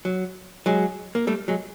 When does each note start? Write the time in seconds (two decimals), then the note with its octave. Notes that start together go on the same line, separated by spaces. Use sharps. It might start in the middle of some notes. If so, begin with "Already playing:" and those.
0.05 F#3
0.66 F#3 G#3
1.15 A#3
1.27 G3 A3
1.48 F#3 G#3